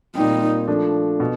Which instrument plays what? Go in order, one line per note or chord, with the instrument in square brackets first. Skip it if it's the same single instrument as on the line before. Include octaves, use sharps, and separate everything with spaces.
[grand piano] A#2 G3 C4 [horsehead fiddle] D#4
[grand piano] F3 A3 D4
B2